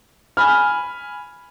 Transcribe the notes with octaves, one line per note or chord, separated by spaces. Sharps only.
G#5 B5 F6